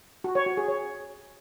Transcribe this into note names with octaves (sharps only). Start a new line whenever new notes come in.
F#4
C#5
F#4
G#4
C#5